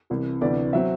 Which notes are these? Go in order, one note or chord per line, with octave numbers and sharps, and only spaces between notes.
C2 C3 E3
D2 C3 E3 B3 D5
F#3 C4 E5